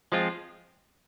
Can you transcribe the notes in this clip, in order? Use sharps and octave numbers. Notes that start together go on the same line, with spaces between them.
F3 G#3 C4 F4